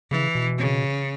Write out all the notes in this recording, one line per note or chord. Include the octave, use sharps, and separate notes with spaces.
C#3 E3
B2
C#3